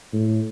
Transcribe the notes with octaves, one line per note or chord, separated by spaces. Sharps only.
A2